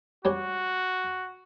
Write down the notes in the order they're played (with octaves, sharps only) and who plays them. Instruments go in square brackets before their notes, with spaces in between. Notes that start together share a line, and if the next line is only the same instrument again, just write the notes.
[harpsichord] G3 C#4 G4 [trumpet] F#4